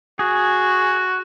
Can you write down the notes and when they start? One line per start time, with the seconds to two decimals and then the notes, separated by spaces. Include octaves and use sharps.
0.19 F#4 G#4